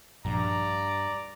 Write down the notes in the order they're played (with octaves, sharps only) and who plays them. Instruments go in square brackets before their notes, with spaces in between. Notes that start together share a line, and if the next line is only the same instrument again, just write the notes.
[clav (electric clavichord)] A#1 [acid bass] G2 [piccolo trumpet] D5 [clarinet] A#5